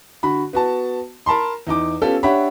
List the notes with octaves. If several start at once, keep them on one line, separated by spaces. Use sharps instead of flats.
D3 F#4 B5
B3 F#4 A5
A#4 A5 B5 C6
E2 D#4 D6
B3 C#4 F4 G4 A4
D4 G4 C#5 E5 F#5 B5